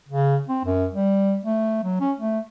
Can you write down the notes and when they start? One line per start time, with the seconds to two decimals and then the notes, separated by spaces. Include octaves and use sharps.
0.09 C#3
0.48 C4
0.65 F#2
0.92 G3
1.46 A3
1.83 F#3
2.01 C#4
2.19 A3